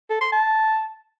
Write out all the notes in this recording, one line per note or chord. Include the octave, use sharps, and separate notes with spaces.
A4
C6
A5